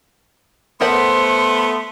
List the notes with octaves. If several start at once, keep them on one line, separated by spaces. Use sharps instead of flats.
A3 B3 A#4 C5 F#5 C6